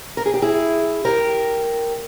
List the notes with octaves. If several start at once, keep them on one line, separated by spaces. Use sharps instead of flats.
A#4
G#4
G4
E4 G#4
G4 A#4